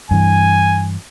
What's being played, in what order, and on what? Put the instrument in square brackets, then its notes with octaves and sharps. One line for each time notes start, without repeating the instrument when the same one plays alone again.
[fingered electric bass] G2 E3 [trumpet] G#5